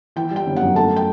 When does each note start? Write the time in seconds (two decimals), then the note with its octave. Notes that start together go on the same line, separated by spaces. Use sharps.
0.16 E3 G5
0.31 G3 G5
0.46 G1
0.56 F#2 F#5
0.76 A3 A5
0.96 G5